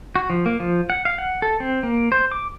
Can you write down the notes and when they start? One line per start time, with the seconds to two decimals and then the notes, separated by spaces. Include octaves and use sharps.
0.16 F#4
0.30 F3
0.46 A#3
0.60 F3
0.90 F#5
1.05 F5
1.18 F#5
1.42 A4
1.60 C4
1.83 A#3
2.12 C5
2.32 D6